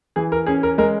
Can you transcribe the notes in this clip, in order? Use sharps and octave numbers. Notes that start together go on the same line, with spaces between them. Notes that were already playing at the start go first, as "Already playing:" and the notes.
E3 G#4
A#4
C#4 G#4
A#4
G#3 A#4